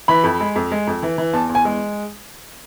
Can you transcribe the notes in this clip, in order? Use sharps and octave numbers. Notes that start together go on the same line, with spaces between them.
E3 B5
F2
G#3
F2
G#3
F2
E3
E3
E2 A5
E2
G#5
G#3